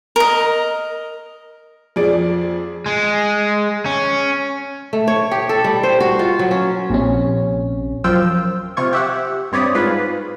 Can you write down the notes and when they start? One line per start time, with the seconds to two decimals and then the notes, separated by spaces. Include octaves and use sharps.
0.16 A#4 D#5
1.96 F2 F3 G#4 D5 D7
2.86 G#3
3.86 C#4
4.93 A3
5.08 C#5
5.31 G4
5.49 A4
5.64 G3
5.83 C5
6.00 F#4
6.19 F4
6.39 F#3
6.51 C#4
6.90 A#1 C3 C#4
8.04 F#2 F3 F4 G5 E6
8.77 C3 F4 C#6 G#6
8.93 G4 E5 F#5
9.52 G2 C4 C#5 D5 B5 D#6
9.75 G#2 F4 B4